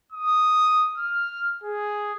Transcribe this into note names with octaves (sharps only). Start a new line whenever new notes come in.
D#6
F6
G#4